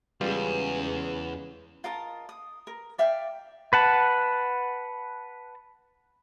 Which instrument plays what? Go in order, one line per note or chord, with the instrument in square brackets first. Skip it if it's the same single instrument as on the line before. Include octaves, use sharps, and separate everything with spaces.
[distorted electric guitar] E2 [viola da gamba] C#3 G#3 C#4 [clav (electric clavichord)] G3 F4 [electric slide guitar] B4
[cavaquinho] F4 A#4 D#5 A5
D#6
A#4
D5 E5 F5 G5
[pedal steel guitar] B4 F#5 A5